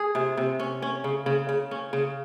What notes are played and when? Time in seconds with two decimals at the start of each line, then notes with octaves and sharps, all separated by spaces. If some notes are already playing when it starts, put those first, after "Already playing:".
Already playing: G#4
0.15 C3
0.37 C3
0.59 C#4
0.82 C#4
1.04 C#3
1.26 C#3
1.49 C#3
1.71 C#4
1.93 C#3